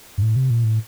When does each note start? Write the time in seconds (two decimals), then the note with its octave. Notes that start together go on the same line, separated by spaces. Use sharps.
0.18 G2
0.22 A2
0.36 C3
0.50 A#2
0.64 A2